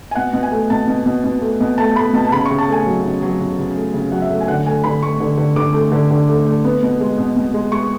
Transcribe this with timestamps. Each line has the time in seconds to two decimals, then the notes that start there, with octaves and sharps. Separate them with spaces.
0.11 G#5
0.15 B2 F#5
0.33 B2
0.43 G#5
0.52 A3
0.70 B2 A5
0.88 B2
1.06 B2
1.24 B2
1.41 A3
1.61 B2
1.78 A3 A5
1.96 A3 B5
2.13 B2 A5
2.25 A5
2.32 C#3 B5
2.46 C#6
2.51 C#3
2.58 A5
2.68 A3 G#5
2.86 F#3
3.03 C#3
3.22 F#3
3.41 C#3
3.58 C#3
3.75 A3
3.94 C#3
4.12 F#3 F#5
4.22 E5
4.30 A3
4.41 G#5
4.48 D3 F#5
4.66 A3 G#5
4.84 D3 B5
5.02 A3 C#6
5.20 D3
5.38 D3
5.56 D3 D6
5.74 A3
5.92 D3
6.11 D3
6.29 A3
6.46 A3
6.64 B3
6.83 B2
7.00 G#3
7.18 B2
7.37 B2
7.54 G#3
7.72 G#3 C#6